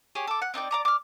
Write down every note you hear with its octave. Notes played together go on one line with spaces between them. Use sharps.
G4 G#4 C#5
A4 D6
F#5
C4 D#4 D5 G5
D5 A#5 D6
D6 F6